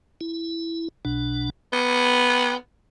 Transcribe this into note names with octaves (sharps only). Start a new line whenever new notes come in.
E4
B1 B2 D4
B3 G5